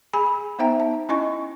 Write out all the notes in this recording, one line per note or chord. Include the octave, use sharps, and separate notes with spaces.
G#4 G#5 B5
B3 D#4 C5 E5 G5 A#5
A5
C#4 E4 D#5 G#5 C#6